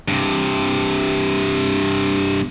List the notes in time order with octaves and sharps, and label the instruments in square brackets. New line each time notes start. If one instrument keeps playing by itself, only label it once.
[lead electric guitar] G2 C3